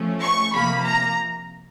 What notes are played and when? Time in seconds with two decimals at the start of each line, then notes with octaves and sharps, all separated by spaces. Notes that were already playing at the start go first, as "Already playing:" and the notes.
Already playing: F3 A3 C#4
0.22 C#6
0.54 C3 F3 A#3 B5
0.85 A#5